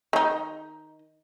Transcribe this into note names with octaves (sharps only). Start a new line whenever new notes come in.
D#3 D#4